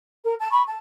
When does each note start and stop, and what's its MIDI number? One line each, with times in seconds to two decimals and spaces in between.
0.24 0.34 70
0.39 0.49 81
0.51 0.62 83
0.51 0.62 85
0.66 0.78 81